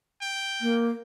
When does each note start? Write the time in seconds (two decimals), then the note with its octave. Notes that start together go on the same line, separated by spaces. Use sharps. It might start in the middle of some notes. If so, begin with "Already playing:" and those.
0.21 G5
0.61 A#3